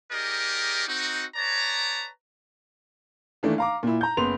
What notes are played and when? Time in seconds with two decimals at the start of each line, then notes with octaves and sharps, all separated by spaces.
0.12 D#4 G4 G#4 A#4 D5 D#5
0.88 C4 D#4 F#4
1.36 B4 C#5 D5 A5 A#5
3.43 D#3 E3 A3 A#3 D4
3.58 F5 A#5 D6
3.83 A#2 E4
4.01 A#5 G6
4.17 F#1 B3 C6 F7